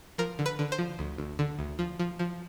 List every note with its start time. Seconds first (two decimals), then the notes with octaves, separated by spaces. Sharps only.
0.18 F3 A#4
0.39 D3
0.46 B4
0.59 D3
0.72 C5
0.78 F3
0.99 D2
1.18 D2
1.39 D3
1.59 D2
1.79 F3
1.99 F3
2.19 F3